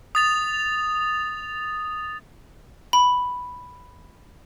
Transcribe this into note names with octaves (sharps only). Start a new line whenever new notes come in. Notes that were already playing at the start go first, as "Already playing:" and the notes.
D#6 A6 F7
B5